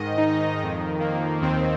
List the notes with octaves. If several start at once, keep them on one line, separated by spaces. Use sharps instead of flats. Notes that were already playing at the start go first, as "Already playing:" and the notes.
Already playing: G#2 D#3 D#5
D#4
F2 D#3
A#3
D#2 D#3 C4